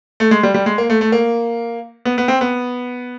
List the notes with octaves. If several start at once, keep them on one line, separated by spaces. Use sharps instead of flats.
A3
G#3
G3
G3
G#3
A#3
A3
A3
A#3
B3
B3
C4
B3